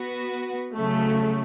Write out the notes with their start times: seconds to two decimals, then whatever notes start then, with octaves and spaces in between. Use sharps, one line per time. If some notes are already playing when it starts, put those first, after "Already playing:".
Already playing: B3 F#4 B4
0.74 C#3 F#3 A3